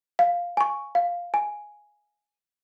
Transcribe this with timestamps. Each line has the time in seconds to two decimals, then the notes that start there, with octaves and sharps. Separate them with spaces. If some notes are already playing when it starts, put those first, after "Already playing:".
0.19 F5
0.57 G#5 C#6
0.95 F5
1.34 G#5